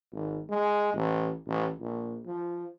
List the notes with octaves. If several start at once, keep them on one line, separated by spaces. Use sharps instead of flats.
G#1
G#3
A1
A1
A#1
F3